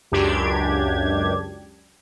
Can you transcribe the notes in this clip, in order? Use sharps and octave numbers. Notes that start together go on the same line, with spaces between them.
C#2 F#2 D4 G4 G#6